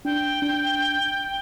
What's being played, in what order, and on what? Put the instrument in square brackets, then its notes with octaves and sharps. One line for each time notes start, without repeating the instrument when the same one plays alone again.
[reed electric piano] D4 [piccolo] G5
[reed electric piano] D4